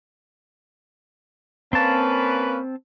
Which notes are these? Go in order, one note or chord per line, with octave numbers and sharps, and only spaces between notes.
A#3 C4 C#4 B4 A5